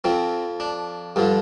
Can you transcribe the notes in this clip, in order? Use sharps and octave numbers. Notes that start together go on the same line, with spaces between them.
F2 F3 C4
D4
G2 D3 F3